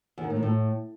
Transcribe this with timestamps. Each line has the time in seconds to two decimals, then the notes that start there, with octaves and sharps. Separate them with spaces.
0.18 E2
0.24 D#3
0.30 A2
0.36 D#3
0.43 A2